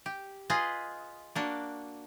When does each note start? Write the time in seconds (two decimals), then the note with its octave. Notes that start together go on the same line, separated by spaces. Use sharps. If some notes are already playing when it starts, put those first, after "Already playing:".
0.06 G4
0.50 F4 G#4 B4 D#5
1.35 A#3 D4 F#4